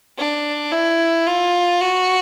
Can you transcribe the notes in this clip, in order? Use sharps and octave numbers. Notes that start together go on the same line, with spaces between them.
D4
E4
F4
F#4